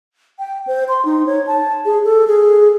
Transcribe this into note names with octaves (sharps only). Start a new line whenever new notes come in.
G5
C5
C6
D#4
C#5
A5
G#4
A4
G#4